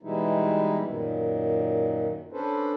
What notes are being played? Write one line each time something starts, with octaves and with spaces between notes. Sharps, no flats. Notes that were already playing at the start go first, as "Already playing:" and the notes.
B2 E3 G3 G#3 D#4 E4
F#2 A#2 D#3
C#4 D4 A4 B4 C5